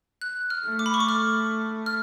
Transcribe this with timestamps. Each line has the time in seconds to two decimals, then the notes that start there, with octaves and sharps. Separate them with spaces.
0.22 F#6
0.50 F6
0.65 A3
0.79 D6
0.86 B5
0.94 C#6
1.00 D6
1.09 F6
1.86 F6